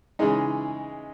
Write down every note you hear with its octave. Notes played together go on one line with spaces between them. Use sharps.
C#3 E3 G#3 D#4